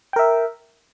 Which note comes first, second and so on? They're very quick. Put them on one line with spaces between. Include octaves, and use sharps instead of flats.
G5 A#4 E5